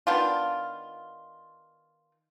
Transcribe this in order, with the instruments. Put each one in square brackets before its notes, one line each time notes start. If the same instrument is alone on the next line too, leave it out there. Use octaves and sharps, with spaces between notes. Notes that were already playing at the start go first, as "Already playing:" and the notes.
[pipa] D#3 B3 D4 F4